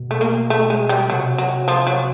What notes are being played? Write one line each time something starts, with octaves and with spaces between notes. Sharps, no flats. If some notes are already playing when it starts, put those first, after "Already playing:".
Already playing: B2
A3
A#3
A3
G#3
G3
C3 F#3
F#3
F3
F#3